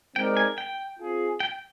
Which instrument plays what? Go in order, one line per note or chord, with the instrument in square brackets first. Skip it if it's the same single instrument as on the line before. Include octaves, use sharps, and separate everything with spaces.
[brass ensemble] G#3 C4 D#4 A#4 D5 [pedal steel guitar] G5
[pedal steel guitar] G#5
G5
[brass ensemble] C4 F4 G#4
[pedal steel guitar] G5